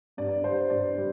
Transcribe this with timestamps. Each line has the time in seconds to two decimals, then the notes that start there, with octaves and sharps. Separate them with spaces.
0.17 G2 D5
0.44 G3 C5
0.70 G2 D5
0.97 G3